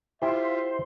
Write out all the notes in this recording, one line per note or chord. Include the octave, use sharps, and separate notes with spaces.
E4 F4 G4 C5 E5